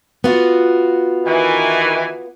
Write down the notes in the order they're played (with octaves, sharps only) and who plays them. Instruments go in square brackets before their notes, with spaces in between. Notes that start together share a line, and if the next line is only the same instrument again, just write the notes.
[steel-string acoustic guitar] B3 F4 F#4
[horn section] D#3 E3 G#5